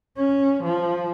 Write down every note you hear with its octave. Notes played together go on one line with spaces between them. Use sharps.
C#4
F3